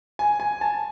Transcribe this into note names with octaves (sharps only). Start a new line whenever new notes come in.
G#5
G#5
A5